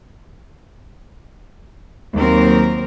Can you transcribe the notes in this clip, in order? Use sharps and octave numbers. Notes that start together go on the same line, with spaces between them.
D#2 F#3 C4 A#4